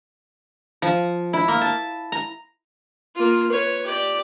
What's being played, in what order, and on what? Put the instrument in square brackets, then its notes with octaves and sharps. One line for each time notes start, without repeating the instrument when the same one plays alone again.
[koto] F3
E4
A#3
A5
A#5
[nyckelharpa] A#3 F4
B4 C#5
G4 D5